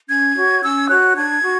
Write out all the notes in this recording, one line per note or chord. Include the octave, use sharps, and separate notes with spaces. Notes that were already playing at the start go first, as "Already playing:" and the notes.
C#4 G#6
F#4 C#5
C#4 E6
G#6
F#4 C#5 F#6
D4 G#6
F#4